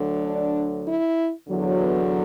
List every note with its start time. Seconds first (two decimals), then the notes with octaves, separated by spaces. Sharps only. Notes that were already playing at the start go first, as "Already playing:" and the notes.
Already playing: D2 D3 F#3
0.24 D4
0.86 E4
1.47 E2 D3 F#3
1.78 B3